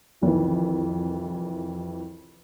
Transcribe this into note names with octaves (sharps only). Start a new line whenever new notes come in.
C2 F2 D#3 E3